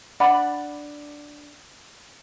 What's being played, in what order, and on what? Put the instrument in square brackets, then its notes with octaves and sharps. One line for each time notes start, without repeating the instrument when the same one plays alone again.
[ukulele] D4 D5 F#5 B5